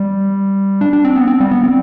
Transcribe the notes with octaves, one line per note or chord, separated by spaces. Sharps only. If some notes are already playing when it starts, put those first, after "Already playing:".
Already playing: G3
D4
D4
C4
B3
C4
G3
B3
C4